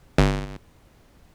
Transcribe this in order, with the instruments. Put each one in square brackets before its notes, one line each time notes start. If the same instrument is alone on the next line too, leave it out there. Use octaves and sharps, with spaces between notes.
[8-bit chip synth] G1